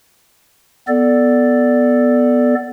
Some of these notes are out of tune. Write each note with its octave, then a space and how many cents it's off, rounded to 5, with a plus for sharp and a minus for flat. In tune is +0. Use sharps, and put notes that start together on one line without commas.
B3 +0 A4 +0 D5 +0